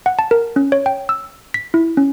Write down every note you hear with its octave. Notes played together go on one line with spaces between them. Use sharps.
F#5
A5
A#4
C#4
C#5
G5
E6
B6
E4
C#4